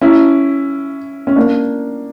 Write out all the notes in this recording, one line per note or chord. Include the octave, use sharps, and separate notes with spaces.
C#4 E4
C#4
A#3 D4